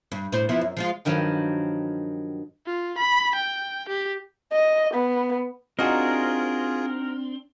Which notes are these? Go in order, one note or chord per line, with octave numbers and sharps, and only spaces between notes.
G2
A2 C5
F3 B3 E4
F#2
F3 G#3 F4
G2 D#3 F3 F#3
F4
B5
G5
G4
D#5
B3
C4 D4 D#4 F4 F#4 G#4 A#4